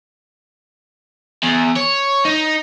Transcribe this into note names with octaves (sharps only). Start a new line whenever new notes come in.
E2
C#5
D#4